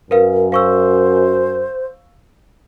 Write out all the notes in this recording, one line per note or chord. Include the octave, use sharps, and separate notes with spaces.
F#2 A#4 B4 F5
C5 F5 C#6 E6